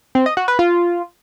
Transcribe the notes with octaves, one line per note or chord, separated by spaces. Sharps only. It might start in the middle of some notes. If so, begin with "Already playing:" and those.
C4
D#5
F#4
B4
F4